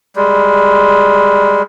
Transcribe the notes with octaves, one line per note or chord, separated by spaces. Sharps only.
G3 G#3